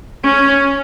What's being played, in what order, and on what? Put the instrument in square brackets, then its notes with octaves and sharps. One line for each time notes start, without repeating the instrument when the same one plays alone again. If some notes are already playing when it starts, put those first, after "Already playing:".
[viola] C#4